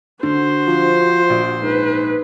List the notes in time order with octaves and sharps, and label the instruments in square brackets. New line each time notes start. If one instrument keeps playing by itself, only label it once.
[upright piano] D3 [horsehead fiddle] F#4 [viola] C5
[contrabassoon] F3
[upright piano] A#1
[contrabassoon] G#2 [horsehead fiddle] B4